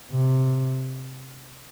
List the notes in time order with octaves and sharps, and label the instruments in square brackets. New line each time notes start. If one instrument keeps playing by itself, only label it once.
[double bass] C3